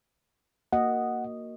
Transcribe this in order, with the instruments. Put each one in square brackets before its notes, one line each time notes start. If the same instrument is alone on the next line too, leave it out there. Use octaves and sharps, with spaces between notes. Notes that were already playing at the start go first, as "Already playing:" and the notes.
[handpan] A#3 F#4 D#5 [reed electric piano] F#5